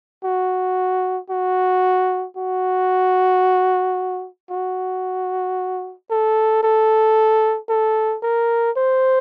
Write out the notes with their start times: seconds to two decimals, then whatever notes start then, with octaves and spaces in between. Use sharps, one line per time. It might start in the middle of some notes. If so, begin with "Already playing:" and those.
0.24 F#4
1.30 F#4
2.37 F#4
4.51 F#4
6.11 A4
6.63 A4
7.69 A4
8.23 A#4
8.77 C5